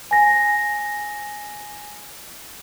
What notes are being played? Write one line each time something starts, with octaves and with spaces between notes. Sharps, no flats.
G#5 A#6